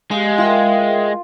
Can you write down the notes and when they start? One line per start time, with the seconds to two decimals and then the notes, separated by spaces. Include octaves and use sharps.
0.11 G#3 G4 F5
0.38 F4 A#4 E5 G5